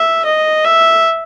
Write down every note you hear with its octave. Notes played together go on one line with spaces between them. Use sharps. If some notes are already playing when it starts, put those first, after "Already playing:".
Already playing: E5
D#5
E5